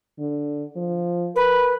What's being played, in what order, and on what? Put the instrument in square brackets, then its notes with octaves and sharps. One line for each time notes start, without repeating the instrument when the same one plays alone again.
[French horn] D3
F3
[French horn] A#4 [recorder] B4